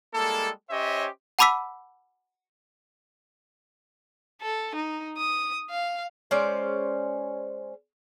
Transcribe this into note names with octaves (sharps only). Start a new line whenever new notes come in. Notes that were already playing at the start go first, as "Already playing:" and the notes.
G3 G#3 A#3 E4 A4
C#4 G4 C5 C#5 D#5 E5
F#5 A5 B5 D6 E6 B6
A4
D#4
D#6
F5
G#3 C#4 C5 D5